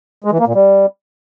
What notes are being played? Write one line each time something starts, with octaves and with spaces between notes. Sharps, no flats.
G#3
E3
A#3
A#2
G3